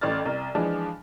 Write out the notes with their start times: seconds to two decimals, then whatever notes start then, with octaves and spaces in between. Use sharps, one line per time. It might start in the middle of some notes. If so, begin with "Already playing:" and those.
0.01 A1 A2 D5 F6 A6
0.25 C2
0.55 E3 F3 G#3 D4